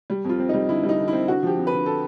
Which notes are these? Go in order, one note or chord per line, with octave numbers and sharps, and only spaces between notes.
G3
F2 F4
C4
G3 D#4
D3 E4
G3
D#4
D3
E4
C4
D3 F#4
F3 G4
F2
B4
D3
A4